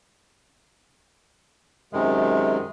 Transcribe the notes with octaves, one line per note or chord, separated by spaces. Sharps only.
F#2 C3 D#3 G#3